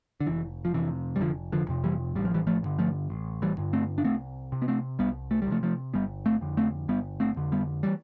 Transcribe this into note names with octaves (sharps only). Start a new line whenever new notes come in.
D3
F1 E3
F3
F2 C3 E3
G3
F1 D3 F3
D3 F3
F2 C3
E3 G3
A1 G3
F3
E3 G3
F3 A3
G2 D3
F3 A3
A1
E3 G3
G2 D3
A3 C4
D4
C2 A3 C4
C3
B3
A3 C4
C2 G3 B3
A3
G3
C3 F3 A3
F3 A3
G1 G3 B3
A3 C4
F2 D3
A3 C4
G1 G3 B3
A3 C4
F2 D3
G3 B3
E3 G3